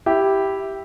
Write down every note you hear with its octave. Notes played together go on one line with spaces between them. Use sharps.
E4 G4